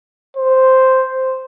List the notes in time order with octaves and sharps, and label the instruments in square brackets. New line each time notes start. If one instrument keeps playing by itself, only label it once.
[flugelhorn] C5